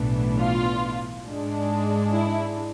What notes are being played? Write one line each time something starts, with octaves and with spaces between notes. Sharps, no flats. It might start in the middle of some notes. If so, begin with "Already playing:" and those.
Already playing: B1 A2 E3 B3 D4
F4
G#2 G#3 D4
E4